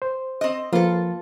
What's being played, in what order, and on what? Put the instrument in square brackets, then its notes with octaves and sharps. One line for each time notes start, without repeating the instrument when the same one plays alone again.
[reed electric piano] C5
[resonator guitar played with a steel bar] C4 D#5
[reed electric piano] F3 A#3 B4 [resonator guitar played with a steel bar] F4 A4